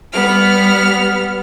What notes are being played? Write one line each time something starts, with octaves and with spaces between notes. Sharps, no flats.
G3 B3 F6